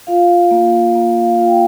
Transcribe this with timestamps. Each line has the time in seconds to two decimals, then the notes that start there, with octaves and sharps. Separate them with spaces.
0.07 F4 F5
0.51 A#3
0.95 A#3
1.17 F5
1.38 F4 F5
1.46 G5